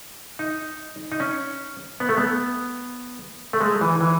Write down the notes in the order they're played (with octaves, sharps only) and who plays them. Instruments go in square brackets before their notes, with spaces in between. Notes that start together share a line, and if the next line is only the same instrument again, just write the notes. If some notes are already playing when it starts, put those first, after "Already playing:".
[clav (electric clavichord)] D#4
D#4
C#4
B3
A3
B3
A3
G#3
E3
E3